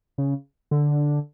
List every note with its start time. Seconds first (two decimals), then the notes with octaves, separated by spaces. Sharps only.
0.18 C#3
0.71 D3